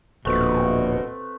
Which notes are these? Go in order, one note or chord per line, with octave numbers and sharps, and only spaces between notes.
D1 A#1 B2 A3 C4 B4